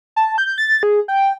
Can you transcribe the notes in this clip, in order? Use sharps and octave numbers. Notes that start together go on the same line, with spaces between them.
A5
G6
A6
G#4
G5